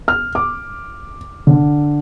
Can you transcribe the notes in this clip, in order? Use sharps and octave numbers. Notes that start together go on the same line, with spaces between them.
F6
D6
D3